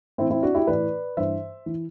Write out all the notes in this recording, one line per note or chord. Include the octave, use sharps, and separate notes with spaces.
A2 E3 C4 E4
C4 E4
D4 F#4
E4 G4
A2 E3 B4 D5
G2 E3 C5 E5
E3